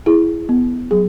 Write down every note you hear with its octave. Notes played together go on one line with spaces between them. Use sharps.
E4 G#4
B3
F#3 G#4